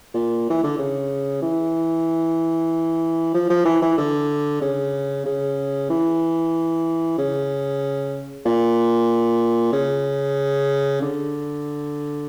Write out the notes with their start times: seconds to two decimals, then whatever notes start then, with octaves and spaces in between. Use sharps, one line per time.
0.14 A#2
0.50 E3
0.63 D3
0.78 C#3
1.42 E3
3.34 F3
3.50 F3
3.65 E3
3.82 E3
3.97 D3
4.61 C#3
5.25 C#3
5.90 E3
7.18 C#3
8.45 A#2
9.73 C#3
11.02 D3